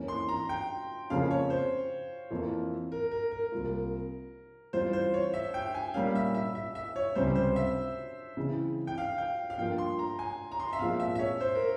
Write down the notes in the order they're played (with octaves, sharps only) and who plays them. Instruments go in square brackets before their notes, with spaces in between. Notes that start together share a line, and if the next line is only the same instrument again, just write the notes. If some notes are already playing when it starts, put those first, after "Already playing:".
Already playing: [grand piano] F2 E3 A#3 C#4
[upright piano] C6
A#5
G5
[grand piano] F2 C#3 F3 A#3 C#4 [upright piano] F5
[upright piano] C#5
C5
[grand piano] F2 E3 A#3 F4
[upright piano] A#4
A#4
A#4
[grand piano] C2 C3 G3 A#3 F4
[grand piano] F2 E3 G3 C#4 F4 [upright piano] C5
[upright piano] C5
C#5
E5
G5
G#5
[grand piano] A#2 G3 A#3 C#4 [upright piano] F5
[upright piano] E5
E5
E5
E5
C#5
[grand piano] C#2 C3 G3 C#4 [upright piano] C5
[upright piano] C5
E5
[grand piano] C#3 E3 G#3 C4 E4
[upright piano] G5
F5
G5
F5
[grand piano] G2 F3 A#3 F4 [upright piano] G5
[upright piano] C6
A#5
G#5
A#5
C6
E5
[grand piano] A#2 F3 G#3 C4 [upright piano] F5
[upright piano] E5
E5
C#5
C5
A#4